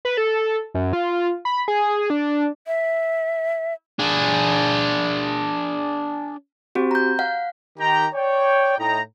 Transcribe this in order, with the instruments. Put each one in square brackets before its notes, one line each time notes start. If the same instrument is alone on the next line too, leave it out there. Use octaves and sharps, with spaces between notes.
[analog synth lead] B4
A4
F#2
F4
B5
G#4
D4
[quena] E5
[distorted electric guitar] D4 G#4
[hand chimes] C4 F#4 G4
A#5 G6
F5 F#5
[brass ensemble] D#3 G4 G5 A#5
C#5 D5 G5
A2 D#4 G5 A#5